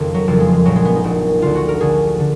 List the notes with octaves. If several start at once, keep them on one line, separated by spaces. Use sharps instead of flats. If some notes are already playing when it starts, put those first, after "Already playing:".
Already playing: F#1 F2 D#3
F#3
F#1 F2 D#3 F3
G#3
G#3
A#1 A#2 F#3
G#3
B3
D#4
A#1 A#2
D2 D3 F4
F#4
A#4
D2 D3 G#4
D3